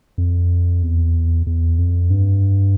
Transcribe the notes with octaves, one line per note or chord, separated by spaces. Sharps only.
F2
E2
E2
F2
G2